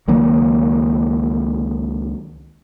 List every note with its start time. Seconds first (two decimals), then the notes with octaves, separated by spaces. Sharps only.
0.08 C#2 D#3 F#3 A#3